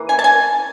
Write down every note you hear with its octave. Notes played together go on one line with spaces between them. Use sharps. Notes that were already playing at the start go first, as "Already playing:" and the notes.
Already playing: E3 A#3
G#5
A5
G#5